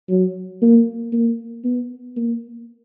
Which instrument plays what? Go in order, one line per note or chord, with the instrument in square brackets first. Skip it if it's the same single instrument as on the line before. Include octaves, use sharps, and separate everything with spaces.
[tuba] F#3
A#3
A#3
B3
A#3